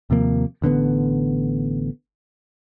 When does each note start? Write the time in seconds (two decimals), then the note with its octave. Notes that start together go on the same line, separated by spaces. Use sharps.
0.10 D#2 C3 F3 A#3
0.62 A1 D3 A#3 B3